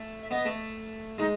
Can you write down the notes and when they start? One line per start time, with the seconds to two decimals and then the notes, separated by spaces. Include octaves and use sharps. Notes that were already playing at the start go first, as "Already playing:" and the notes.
Already playing: A3
0.22 E5
0.31 B3 D#5
0.45 A3
1.18 G#3 D#4